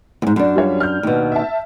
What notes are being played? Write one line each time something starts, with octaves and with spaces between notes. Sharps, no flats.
E2 G#2
F#2 D4
G3 F4 C#5
F6 G6
D#2 B2
E5 A5